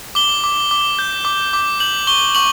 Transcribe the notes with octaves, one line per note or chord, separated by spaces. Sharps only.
D6 G7
D6
D6
G6
D6
D6
G6 F#7
C#6 G7
C#6 F#7